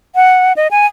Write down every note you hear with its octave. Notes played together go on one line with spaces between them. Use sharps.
F#5
D#5
G#5